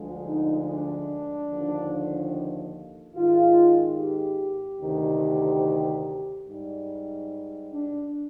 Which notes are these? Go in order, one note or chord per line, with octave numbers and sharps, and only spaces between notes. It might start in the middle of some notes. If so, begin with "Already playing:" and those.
Already playing: D2 D3 F3 G#3
D#4
D4
D#2 D3 F3
G#2 D#3 G#3 F4
G4
D2 C3 D#3
G#2 G3
D4